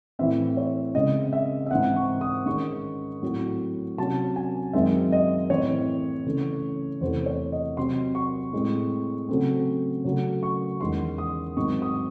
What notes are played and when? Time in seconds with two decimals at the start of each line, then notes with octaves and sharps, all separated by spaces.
0.19 A2 E3 C4 E5
0.57 C#5
0.94 C#3 G#3 C4 D#5
1.33 E5
1.67 E5
1.71 G#2 E3 C4 F#5
1.96 C#6
2.21 D#6
2.46 G#2 D#3 G#3 C#4 C#6
3.23 A2 F#3 C4
3.98 C3 F#3 C#4 A5
4.36 G#5
4.73 F#2 D#3 G#3 C4 E5
5.12 D#5
5.50 A2 E3 C4 C#5
6.26 C#3 E3 A3 C#4
7.01 E2 C3 E3 A3 C5
7.26 C#5
7.52 D#5
7.77 C3 F#3 C4 C6
8.15 C#6
8.53 A2 G#3 C4
9.29 C#3 F#3 A3 C4
10.05 C#3 F#3 A3
10.43 C#6
10.80 E2 D#3 G#3 C#4 C6
11.18 D#6
11.57 G#2 D#3 F#3 C4 C#6
11.82 D#6